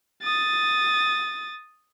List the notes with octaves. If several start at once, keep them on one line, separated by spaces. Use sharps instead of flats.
D#6 A6